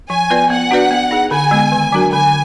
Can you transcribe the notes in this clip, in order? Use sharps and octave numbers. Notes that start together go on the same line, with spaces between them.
F3 G#5
B3 F4 B4 D5
B3 F#5
D4 F#4 B4 D5
B3
D#4 G#4
D3 G#5
G#3 B3
D#3
F#3 D4 F#4 A#4
D3 G#5